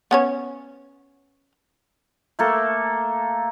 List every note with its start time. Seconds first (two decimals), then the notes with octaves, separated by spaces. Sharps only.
0.11 B3 C#4 C#5
2.39 A3 A#3 A4